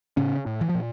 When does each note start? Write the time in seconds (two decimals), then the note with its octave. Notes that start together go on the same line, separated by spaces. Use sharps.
0.17 A2 C#3 C#4
0.46 A2
0.61 E3
0.69 F3
0.75 A#2